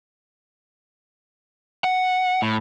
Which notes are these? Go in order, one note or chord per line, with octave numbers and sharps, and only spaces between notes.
F#5
A2